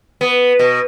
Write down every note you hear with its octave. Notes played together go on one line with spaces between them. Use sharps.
B3
B2